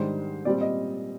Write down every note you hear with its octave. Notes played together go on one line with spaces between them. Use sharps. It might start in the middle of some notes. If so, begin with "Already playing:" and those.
Already playing: G#2 D#3 G3 D4 C5
A#2 G3 C4 D5
D#5